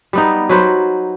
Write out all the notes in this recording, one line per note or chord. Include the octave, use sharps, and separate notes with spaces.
G3 B3 D#4
F#3 B4 C5